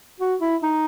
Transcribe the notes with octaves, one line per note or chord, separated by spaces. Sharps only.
F#4
E4
D#4